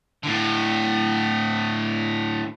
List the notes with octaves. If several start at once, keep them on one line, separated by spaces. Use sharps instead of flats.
A2 D3